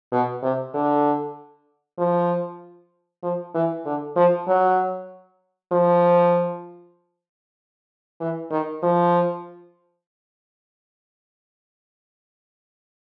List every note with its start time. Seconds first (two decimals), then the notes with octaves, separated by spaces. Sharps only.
0.12 B2
0.43 C3
0.74 D3
1.99 F3
3.23 F3
3.54 E3
3.85 D3
4.16 F3
4.47 F#3
5.72 F3
8.20 E3
8.51 D#3
8.83 F3